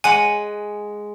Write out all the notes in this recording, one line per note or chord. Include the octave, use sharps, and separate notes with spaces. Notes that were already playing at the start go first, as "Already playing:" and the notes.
G#3 F#5 G#5